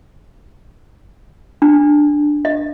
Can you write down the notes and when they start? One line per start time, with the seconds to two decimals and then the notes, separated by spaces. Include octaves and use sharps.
1.62 D4
2.45 D#5